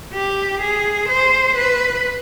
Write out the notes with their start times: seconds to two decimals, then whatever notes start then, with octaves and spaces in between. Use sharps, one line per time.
0.14 G4
0.61 G#4
1.09 C5
1.56 B4